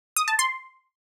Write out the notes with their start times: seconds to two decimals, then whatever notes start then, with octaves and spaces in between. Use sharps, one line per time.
0.16 D#6
0.28 A5
0.39 C6